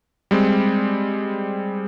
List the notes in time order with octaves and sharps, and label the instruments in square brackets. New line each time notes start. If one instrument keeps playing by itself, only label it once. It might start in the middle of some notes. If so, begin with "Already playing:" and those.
[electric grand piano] G3 G#3 C4